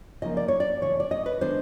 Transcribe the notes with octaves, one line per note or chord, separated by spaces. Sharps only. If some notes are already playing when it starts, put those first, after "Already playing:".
C#3 F3 A#3 D#4 D#5
D5
C#5
D5
C#3 E3 A3 C#5
D5
D#5
B4
D#3 G#3 B3 D4 C5